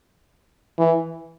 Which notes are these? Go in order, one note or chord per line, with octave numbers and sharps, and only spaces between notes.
E3